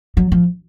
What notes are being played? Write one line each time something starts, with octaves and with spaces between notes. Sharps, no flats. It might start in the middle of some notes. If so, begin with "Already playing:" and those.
F#3
F3